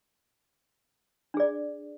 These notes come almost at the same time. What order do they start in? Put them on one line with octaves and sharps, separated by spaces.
D4 G#4 D5